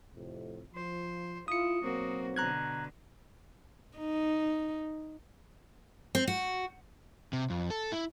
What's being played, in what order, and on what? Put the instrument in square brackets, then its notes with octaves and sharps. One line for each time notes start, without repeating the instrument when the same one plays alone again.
[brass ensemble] F2 A2 C3
[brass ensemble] F3 [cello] C5
[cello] E4 [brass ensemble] F4 [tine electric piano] D#6 C#7
[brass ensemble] B1 F#3 C4 [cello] A#3 F#4
[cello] B2 D3 [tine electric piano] A#5 F#6 G#6
[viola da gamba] D#4
[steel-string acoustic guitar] C4
F#4
[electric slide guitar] C3
F2
A4
E4